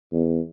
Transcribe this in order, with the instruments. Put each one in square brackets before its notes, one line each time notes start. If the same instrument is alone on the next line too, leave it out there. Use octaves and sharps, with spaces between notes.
[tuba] E2